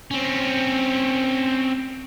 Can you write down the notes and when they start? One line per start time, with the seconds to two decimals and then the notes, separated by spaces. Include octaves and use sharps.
0.11 C4 C#4